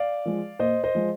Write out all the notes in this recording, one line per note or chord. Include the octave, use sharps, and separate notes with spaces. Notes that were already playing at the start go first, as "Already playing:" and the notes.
Already playing: D5 F5
F3 G#3
A#2 C5 D#5
C5 D#5
F3 G#3